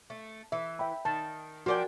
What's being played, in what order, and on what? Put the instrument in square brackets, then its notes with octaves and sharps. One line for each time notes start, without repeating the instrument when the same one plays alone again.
[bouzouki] A3
[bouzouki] E3 [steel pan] E5
[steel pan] E5 G5 B5
[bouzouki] D#3 [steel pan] A5
[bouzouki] F3 D4 G5 [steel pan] F#4 A#4 G#5